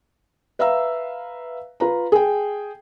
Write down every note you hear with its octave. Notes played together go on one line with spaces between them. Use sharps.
B4 E5 F5 A#5 E6
F4 B4 A#5
G#4 G5